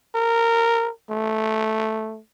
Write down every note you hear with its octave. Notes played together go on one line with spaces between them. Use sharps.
A#4
A3